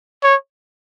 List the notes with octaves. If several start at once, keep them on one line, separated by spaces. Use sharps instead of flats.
C#5